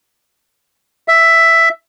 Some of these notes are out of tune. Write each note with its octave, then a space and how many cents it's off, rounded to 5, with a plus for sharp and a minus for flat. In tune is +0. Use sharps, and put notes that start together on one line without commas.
E5 +5